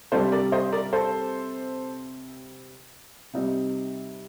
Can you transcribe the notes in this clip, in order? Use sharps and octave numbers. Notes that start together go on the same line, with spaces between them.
C3 G3 D4 A4 C5
A#4 D5
C5 D#5
A#4 D5
A4 C5
C3 G3 C4 D#4